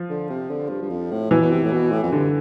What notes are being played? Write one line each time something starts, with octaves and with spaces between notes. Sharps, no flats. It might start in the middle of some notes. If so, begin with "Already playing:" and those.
Already playing: F3
D3
C3
D3
G2
G2
F2
A2
B2 E3
B2
C3
A2
B2
A2
F2
G2 D3